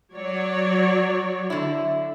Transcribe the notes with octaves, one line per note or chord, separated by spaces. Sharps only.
F#3 C#5 D5
D3 E4